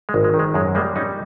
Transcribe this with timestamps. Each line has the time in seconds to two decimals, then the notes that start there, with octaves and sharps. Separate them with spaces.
0.09 G#3
0.14 G#1
0.24 G#3
0.34 D#3
0.39 G#3
0.54 F#2 G#3
0.75 G3 G#3 A#3
0.96 G3 C#4 D#4